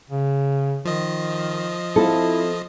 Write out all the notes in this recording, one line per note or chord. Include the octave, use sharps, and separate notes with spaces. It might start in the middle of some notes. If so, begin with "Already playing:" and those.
C#3
D#3 F3 D#5
C4 E4 F4 A4